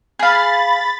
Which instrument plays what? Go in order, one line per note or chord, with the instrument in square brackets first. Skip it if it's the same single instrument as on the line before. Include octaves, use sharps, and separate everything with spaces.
[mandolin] G#4 F5 [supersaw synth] B5 A6